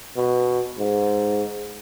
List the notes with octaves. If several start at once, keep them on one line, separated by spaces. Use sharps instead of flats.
B2
G#2